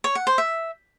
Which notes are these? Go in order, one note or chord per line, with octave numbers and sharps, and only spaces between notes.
C#5
F#5
C5
E5